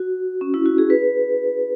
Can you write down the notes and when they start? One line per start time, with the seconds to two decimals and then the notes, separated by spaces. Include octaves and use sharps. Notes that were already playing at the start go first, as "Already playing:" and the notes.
Already playing: F#4
0.41 C#4
0.54 E4
0.66 F#4
0.78 G#4
0.90 B4